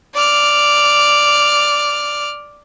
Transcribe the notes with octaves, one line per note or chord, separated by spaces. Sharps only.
D5 F6